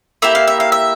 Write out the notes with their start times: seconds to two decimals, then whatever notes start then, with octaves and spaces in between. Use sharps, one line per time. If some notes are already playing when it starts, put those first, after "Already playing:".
0.22 A#3 E4 G4 E5
0.35 F5
0.47 E5
0.60 F5
0.72 E5